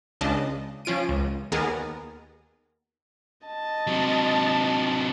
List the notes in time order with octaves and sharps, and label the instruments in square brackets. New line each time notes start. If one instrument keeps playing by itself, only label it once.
[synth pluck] C#2 C#3 D4 D#5 A5
F3 C#4 F4 D7 D#7
C#2
D#2 B3 G#4 A#4 A6
[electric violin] D#5 A5
[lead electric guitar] C3 F#3